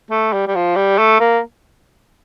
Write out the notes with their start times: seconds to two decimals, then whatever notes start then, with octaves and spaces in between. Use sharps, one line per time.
0.11 A3
0.33 G3
0.47 G3
0.55 F3
0.76 G3
0.99 A3
1.20 A#3